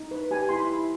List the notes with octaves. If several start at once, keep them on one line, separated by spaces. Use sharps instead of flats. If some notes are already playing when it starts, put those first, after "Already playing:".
Already playing: D#4
B4
G4 G#5
E4 C6
B5
E4